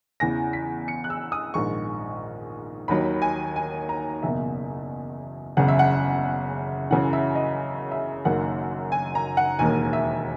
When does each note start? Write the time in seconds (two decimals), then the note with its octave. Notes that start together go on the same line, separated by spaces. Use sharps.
0.20 E2 C#3 E3 A#6
0.53 B6
0.88 C#7
1.04 F#6
1.10 E6
1.32 D#6
1.54 A#1 G#2 D#3 C#6
2.88 D#2 D#3 F#3 B5
3.22 G#5
3.56 G#5
3.89 A#5
4.23 F#1 E2 B2 A#3 E5
5.57 F#1 E2 C#3 F#5
5.68 E5
5.79 F#5
6.91 F#2 C#3 E3 F#5
7.13 E5
7.35 D#5
7.92 E5
8.25 F#1 F#2 D#3 A#3 F#5
8.92 G#5
9.15 A#5
9.37 F#5
9.59 E1 D#2 D#3 A#3 G#5
9.93 E5